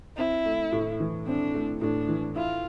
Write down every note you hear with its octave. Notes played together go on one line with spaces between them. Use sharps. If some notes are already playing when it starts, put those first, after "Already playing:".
C4 E4
A3
A2
E3
C4 D4
A3
A2 D4
E3
E4 F4